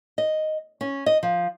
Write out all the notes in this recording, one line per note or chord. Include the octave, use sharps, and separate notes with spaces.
D#5
C#4
D#5
F3